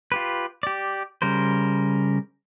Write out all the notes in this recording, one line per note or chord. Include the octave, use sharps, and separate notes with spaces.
F4 G4 B4
G4 D5
C#3 G3 A#4 C5